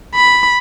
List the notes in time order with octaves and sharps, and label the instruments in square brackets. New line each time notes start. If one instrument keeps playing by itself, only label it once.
[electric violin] B5